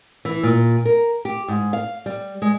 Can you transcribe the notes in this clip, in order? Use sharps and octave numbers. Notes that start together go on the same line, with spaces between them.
E3
A#2
A#4
G4
G#2
F5
G3
G#3